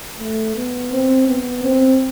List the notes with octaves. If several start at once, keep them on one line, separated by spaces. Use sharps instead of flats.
A3
B3
C4
B3
C4